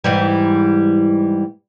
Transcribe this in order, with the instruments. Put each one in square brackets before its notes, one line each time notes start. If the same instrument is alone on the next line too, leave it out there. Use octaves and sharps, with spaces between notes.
[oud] G#2 E3 G3